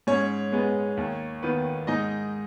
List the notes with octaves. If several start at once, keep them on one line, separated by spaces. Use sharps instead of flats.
G#2 C#4 C#5
G#3 B3
D#2
D#3 B3
G#2 D#4 D#5